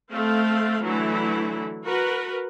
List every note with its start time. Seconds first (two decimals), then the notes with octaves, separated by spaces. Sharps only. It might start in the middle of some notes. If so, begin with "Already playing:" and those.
0.11 A3 C4 F5
0.83 D3 E3 F#3 A3 E4
1.86 F#4 A#4 B4